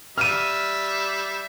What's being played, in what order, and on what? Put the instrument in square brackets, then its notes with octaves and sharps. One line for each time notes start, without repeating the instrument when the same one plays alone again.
[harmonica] G3 E5 [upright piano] F6 D#7